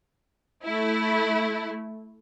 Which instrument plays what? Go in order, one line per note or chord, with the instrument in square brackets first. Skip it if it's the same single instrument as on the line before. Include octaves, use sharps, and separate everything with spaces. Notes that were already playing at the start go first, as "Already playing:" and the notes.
[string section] A3 E4